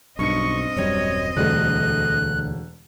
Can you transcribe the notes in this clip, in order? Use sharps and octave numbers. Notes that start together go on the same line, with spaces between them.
B1 G2 C4 D#5 C#6 C#7
D#1 F#2 G3 C#5
E1 D2 G3 A3 F#6